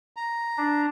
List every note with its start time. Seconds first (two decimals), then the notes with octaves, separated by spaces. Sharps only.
0.17 A#5
0.58 D4